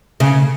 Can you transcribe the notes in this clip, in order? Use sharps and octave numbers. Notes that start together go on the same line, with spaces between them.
C#3